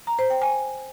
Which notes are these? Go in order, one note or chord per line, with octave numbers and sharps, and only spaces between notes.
A#5
C5
G5
G#5